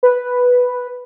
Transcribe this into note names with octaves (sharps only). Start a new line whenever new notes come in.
B4